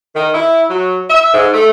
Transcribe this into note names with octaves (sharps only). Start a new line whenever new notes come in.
D#3
E4
F#3
E5
G#2
A3